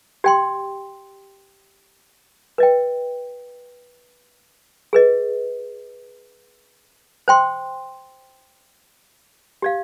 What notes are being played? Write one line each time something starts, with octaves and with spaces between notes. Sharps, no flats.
G4 D5 G5 C6
B4 D#5 G5
G#4 B4 D#5
C5 G5 C6
G4 D5 F5